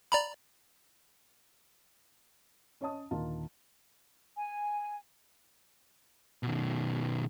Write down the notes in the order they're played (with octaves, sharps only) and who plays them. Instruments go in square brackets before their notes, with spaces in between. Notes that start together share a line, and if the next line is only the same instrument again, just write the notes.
[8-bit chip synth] D5 A#5 B5
[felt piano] C#4 C#5 D#5 A5 D#6
D#1 D3 D#3 A#3 F4 A5
[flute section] G#5
[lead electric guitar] B2 D#3